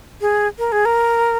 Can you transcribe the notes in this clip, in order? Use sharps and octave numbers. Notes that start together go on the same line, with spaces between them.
G#4
A#4
G#4
A#4